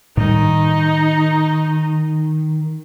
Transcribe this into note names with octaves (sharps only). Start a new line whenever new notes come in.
A2 D#3 G3 D#4